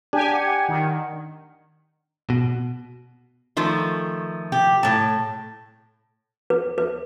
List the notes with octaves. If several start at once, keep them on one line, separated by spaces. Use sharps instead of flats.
D4 G4 G#5
F#5
D#3
B2
D#3 F3 A3
G4
A2 A5
B4
B4